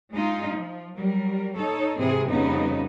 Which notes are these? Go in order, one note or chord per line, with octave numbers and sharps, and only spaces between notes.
G#3 D#4 F4
F3
F#3 G3 A#4
D#4 A4 C#5
G#2 C3 E3 C4 G#4
F2 C#3 G3 B3 D#4